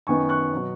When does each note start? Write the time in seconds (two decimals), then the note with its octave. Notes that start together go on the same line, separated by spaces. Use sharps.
0.07 F#2 D#3 B3 G#5 C#6
0.29 C#6 F#6
0.53 B2 F#3 B3